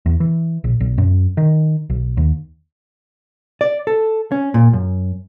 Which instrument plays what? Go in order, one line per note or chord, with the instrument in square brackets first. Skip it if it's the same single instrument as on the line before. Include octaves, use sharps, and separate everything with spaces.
[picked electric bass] E2
E3
A#1
B1
F#2
D#3
B1
D#2
[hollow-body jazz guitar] D5
A4
C#4
A#2
F#2